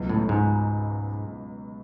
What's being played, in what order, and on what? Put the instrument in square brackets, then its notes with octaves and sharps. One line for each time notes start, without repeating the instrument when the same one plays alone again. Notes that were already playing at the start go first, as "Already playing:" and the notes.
Already playing: [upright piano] C#2 B2 F#3
[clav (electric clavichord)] A2
G#2